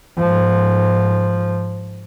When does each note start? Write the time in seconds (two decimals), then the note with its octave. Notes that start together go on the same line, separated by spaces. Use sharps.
0.18 G#2 F3